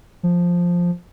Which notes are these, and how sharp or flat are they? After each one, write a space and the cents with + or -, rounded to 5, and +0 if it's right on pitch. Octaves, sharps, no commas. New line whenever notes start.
F3 +5